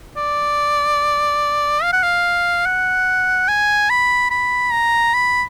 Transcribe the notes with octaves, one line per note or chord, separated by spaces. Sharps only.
D5
F5
F#5
F5
F#5
G#5
B5
B5
A#5
B5